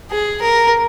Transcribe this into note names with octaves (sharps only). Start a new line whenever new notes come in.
G#4
A#4